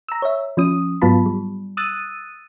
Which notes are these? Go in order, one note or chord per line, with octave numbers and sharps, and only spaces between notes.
A#5 E6
C#5 E5
F3 C#4 D#6
G#2 F#3 B3 F4 A5 B5
G3
D#6 E6 F#6 A6 D#7